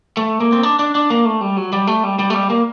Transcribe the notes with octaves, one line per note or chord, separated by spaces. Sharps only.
A3
A#3
C4
D4
D4
D4
A#3
A3
G3
F#3
G3
A3
G3
G3
A3
G3
A#3